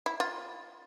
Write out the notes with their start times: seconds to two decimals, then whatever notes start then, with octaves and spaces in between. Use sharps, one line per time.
0.06 E4
0.20 F4